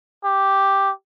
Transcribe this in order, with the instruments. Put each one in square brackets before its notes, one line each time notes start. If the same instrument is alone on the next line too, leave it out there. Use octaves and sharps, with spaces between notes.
[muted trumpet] G4